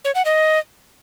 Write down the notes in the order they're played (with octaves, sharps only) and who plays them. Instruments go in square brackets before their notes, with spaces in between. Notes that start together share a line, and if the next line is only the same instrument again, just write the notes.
[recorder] C#5
F#5
D#5